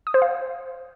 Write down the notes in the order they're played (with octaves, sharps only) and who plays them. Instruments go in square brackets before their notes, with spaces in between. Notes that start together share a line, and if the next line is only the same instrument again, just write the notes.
[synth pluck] D#6
C5
F5